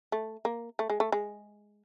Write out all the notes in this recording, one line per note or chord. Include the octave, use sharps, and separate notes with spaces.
A3
A#3
A3
G#3
A3
G#3